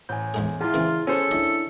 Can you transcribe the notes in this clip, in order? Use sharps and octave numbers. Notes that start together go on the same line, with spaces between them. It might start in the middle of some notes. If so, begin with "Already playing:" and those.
A1 G#5 G6
E2 G#2 G#4
E2 E4 F4 G#4
C#3 E3 C4
C#4 G#4 A4 C5
D4 E4 D#5 E5 C#6